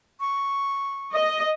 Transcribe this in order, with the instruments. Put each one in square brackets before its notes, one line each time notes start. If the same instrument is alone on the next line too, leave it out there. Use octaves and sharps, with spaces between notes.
[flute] C#6
[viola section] D#5